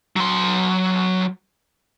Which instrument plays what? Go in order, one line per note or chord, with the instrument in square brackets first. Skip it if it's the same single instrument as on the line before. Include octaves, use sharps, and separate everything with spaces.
[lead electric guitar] F#3 C6